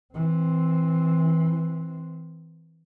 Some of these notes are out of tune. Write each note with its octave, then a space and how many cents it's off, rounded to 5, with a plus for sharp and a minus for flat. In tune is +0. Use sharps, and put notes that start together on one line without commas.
E3 -15 C4 +0